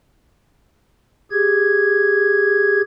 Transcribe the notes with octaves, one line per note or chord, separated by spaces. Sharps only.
G4 G#4 G#6